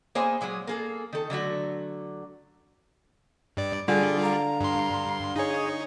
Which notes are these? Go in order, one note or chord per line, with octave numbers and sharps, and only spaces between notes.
A#3 G#4 C5 C#5 G#5
A#2 F#3 G#3 G#4
A#3 G#4 A4
D#3 A4
D3 F#3 A3 F#4
G2 D5
D3 G3 F4 G#4 D5 G#5
F5 A#5
G2 C6
D#4 G#4 C#5